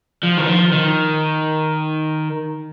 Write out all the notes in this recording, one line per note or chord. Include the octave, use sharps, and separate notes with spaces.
F3
D#3
F3
D#3